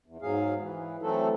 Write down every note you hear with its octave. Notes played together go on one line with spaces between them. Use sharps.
E2
G#2 F#3 G#4 F5
E3
E3 F#3 A3 C4 A4